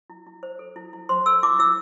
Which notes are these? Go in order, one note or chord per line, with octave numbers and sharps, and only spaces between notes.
E4
E4
C5
A4
E4
E4
C5 C6
A4 E6
E4 D6
E4 E6